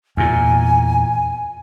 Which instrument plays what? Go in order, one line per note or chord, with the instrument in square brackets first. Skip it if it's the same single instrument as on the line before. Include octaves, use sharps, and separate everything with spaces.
[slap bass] E2 A#2 [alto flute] G#5